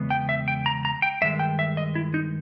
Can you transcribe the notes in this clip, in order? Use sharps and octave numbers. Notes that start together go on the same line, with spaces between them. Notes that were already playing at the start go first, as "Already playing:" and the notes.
Already playing: E2 C#3 G#3 B3
G5
E5
G5
A#5
A#5
G5
G2 D#3 G#3 E5
G5
E5
D#5
E4
D#4